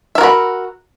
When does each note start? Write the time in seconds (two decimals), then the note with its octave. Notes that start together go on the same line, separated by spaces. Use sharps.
0.15 E5
0.18 A#4
0.21 F#4
0.23 B5